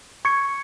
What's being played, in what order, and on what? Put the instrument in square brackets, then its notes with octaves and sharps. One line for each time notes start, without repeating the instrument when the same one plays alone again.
[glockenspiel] C#6 G#6 C#7